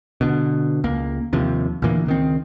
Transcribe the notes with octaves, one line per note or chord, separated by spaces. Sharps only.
B2 D3
C#2 A#3
D#2 C3 F3
D2 A#2 E3 A#3
C#2 D#3 C4